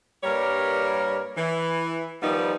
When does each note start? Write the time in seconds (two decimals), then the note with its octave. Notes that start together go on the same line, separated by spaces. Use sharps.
0.24 G2 G3 A#3 A#4 C#5
1.36 E3
2.22 D#3 F3 G3 B3 D#4